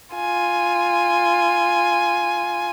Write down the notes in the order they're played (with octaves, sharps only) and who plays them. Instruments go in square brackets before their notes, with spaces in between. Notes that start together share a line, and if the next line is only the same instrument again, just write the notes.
[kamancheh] F4 G#5